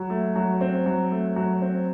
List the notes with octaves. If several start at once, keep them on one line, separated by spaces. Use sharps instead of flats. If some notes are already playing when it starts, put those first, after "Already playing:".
Already playing: F#3
A3
F#3
C4
F#3
A3
F#3
C4